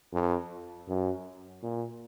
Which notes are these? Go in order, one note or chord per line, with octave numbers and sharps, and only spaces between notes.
F2
F#2
A#2